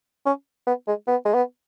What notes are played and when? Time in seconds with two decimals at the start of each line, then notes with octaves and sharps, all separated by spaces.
0.26 C#4
0.67 B3
0.87 G#3
1.07 B3
1.25 G#3
1.34 B3